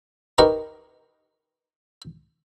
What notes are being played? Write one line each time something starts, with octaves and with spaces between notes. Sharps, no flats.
D#4 G4 A#4 B4 C#6